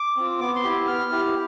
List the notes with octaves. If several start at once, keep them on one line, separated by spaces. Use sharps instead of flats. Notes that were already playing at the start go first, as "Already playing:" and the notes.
Already playing: D6
C4 F4
B3 D6
C6
E4 G4
B3 F6
E4 G4